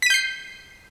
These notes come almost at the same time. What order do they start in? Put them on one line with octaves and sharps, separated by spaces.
B6 D#7 G6 C7